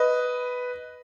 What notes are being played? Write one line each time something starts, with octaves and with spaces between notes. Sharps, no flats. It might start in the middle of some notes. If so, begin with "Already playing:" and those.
Already playing: B4 D#5